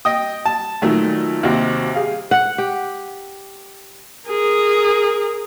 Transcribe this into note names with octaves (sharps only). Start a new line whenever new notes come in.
D#5 G5 D#6
A5
A#2 D#3 F#3 A3
D#2 C3 C4 F#4
G4 G#4 F5
F#5
G4
G#4 A#4